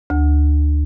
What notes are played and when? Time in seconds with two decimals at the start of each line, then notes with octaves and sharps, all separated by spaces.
0.10 D2